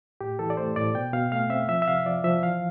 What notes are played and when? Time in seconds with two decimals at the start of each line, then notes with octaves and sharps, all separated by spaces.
0.21 A2 G4
0.39 E3 A4
0.50 D5
0.57 A3 C5
0.76 A2 D5
0.94 B2 G5
1.13 B2 F5
1.32 A3 F5
1.50 C4 E5
1.69 F3 E5
1.82 E5
1.88 C3 F5
2.06 F3 D5
2.24 F3 E5
2.43 E3 F5